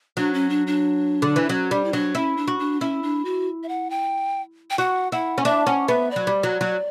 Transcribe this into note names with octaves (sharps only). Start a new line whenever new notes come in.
F#3 D4
C#4
D4
D4
D3
E3
F#3 C#4
G3 D4
E4
F#3 D4
C#4 E4
D4
F#4
D4
C#4 E4
D4
F#4
E5
F#5
G5
G5
F#4 F#5
E4 F#5
C#4
D4 E5
C#4 F#5
B3 E5
F#3 D5
G3
F#3
F#3